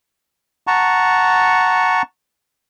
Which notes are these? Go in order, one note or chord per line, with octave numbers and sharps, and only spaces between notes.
F#5 A5 A#5 C#6